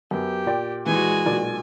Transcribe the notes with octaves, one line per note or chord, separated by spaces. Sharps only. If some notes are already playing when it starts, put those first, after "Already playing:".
F#2 B3 G4
A#2 D5 G5
E3 G#3 F#4 G#5
B1 A#2 D5